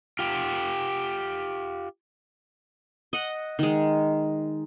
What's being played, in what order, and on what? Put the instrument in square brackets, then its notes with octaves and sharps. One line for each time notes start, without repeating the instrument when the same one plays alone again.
[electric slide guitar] F4 G4
[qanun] D#5 F#5
D#3 G#3